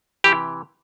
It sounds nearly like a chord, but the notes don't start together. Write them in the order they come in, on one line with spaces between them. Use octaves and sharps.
E3 G4 C3